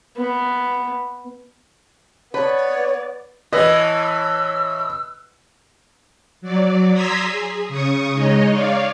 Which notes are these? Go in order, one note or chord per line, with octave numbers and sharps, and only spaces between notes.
B3
B3 B4 C#5 D5
A2 E3 B4 D#5 E6
F#3 D5
A#5 C6 D#6 E6 G#6 B6
G#4
C#3 C#6 D#6
G#3 D#4 C#5 D#5
C#5 D5 F5